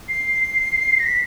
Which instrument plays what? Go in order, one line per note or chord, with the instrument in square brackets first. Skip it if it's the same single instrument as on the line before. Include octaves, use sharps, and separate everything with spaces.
[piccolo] C7
A#6
B6